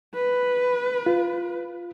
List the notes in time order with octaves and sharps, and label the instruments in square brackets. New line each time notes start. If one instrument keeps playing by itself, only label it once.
[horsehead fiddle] B4
[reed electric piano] F4